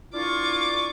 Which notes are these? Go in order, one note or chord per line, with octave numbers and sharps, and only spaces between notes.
D4 E4 F4 C#6 D6